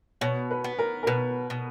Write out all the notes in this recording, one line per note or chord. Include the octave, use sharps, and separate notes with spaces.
B2 C#5
B4
B3
A#4
A#4
B2 B4
B2